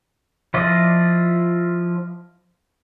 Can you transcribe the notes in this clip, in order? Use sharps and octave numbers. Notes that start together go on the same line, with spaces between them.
F3 E4 F4 D5 D#5